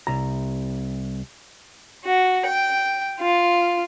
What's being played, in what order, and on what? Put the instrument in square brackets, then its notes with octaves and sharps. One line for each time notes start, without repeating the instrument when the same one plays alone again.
[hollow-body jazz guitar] C2 A#5
[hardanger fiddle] F#4
G5
F4